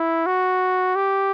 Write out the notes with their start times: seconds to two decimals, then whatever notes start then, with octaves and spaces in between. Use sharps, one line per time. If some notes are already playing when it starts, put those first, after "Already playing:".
Already playing: E4
0.26 F#4
0.96 G4